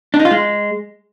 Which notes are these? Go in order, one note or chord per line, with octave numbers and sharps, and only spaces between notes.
D4
D#4
F4
G#3